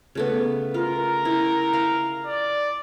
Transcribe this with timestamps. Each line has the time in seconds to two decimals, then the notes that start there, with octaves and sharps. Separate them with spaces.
0.15 C#3 A3 B3
0.74 F4 A#4
1.25 E4
1.73 F5
2.26 D5